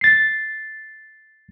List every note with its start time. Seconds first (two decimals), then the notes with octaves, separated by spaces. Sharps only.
0.01 A6 C7